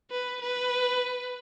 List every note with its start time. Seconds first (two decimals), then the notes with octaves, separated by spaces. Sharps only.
0.10 B4
0.41 B4